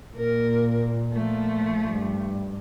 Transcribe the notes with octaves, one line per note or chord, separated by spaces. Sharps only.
A#2 A#3 A#4
F3 A3
G2